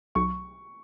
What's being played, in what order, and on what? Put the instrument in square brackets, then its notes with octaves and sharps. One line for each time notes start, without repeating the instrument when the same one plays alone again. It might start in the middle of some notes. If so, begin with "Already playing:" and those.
[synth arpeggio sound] B1 [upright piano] C#6